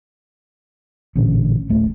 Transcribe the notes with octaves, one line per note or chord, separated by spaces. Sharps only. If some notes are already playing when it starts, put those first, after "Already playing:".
A1 A#2 D3 C#4
D1 A3